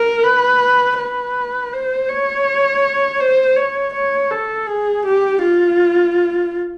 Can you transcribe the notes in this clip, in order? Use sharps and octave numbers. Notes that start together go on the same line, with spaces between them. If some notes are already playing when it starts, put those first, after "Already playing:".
Already playing: A#4
B4
B4
C5
C#5
C5
C#5
C#5
A4
G#4
G4
F4